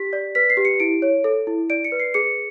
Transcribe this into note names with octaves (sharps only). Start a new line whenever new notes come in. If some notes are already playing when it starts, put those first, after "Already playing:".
Already playing: G4 B6
D5
B4 B6
C7
G4
C#7
E4 D7
C#5
A4
E4
D5 D7
C#7
B4
C7
G#4 C#7